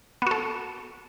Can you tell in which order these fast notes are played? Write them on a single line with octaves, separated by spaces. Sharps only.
B3 F#4 A4